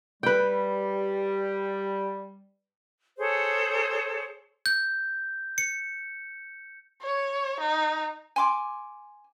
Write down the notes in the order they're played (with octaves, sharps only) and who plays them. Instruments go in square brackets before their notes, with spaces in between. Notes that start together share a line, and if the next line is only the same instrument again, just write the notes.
[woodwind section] G3 [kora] B4 G5
[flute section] G#4 A4 C5 C#5
[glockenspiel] G6
C#7
[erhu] C#5
D#4
[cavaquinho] G#5 C6 D6